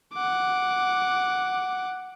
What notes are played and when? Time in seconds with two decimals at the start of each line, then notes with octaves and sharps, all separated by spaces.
0.13 F#5 D6